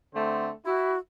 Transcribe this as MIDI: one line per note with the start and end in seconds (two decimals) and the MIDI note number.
0.13 0.50 50
0.13 0.50 57
0.13 0.50 60
0.66 0.93 64
0.66 0.98 66